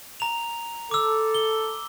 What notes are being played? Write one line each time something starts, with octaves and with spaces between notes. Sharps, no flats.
A#5 F7
A4 D6 E6
G7